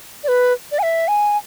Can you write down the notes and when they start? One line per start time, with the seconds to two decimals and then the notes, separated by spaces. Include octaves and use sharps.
0.24 D5
0.28 B4
0.72 D5
0.79 G#5
0.83 E5
1.08 G#5